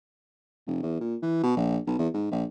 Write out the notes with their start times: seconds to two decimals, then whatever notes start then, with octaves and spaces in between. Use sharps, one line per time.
0.67 F1
0.83 E2
1.00 A#2
1.22 E3
1.43 B2
1.56 A#1
1.87 B1
1.98 E2
2.14 G#2
2.31 A#1